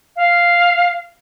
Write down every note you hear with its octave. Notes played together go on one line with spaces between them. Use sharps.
F5